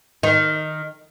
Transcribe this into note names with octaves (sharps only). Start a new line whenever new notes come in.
D#3